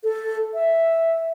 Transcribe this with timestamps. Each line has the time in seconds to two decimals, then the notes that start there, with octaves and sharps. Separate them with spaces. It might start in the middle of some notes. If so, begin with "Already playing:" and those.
0.04 A4
0.54 E5